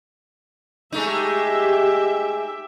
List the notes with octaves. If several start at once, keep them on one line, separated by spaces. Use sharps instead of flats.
G#3 A3 D#4 G4 E5